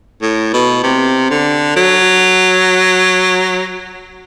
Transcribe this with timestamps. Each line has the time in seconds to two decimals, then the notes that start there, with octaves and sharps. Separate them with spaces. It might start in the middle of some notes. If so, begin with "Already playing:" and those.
0.22 A2
0.53 B2
0.83 C3
1.30 D3
1.76 F#3